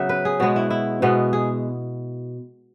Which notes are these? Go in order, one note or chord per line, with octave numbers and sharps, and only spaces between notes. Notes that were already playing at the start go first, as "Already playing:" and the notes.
Already playing: C#3 F#3 B3 E5 F#5
B4
G#4
B2 G#3 B3 F#4
E4
E4
B2 G#3 B3
G#4